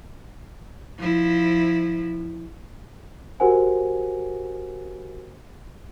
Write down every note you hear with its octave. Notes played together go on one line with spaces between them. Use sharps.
F3 E4
F#4 G4 A#4 C5 F#5 G#5